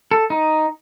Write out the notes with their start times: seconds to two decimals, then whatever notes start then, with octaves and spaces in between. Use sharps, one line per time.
0.11 A4
0.30 D#4